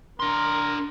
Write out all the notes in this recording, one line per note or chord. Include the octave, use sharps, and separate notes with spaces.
D4 A#4 C6